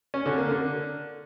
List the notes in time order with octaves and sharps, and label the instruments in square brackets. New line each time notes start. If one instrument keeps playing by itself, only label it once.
[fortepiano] C#4
D3
A#3
D3